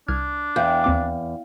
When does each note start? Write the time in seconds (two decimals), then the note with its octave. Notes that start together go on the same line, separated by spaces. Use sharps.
0.08 C2 D4 F6 G#6
0.56 E2 F5 G5 G6
0.84 D#2 C4 D6